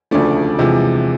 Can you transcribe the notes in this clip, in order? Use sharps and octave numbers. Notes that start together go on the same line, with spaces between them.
E1 D2 C#3 F3 A3 D4 D5
E2 C3 F3 G#3